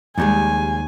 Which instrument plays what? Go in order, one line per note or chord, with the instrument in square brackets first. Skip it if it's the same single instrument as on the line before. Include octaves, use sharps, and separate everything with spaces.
[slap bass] D#2 [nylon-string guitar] F3 G3 G#3 [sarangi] G#5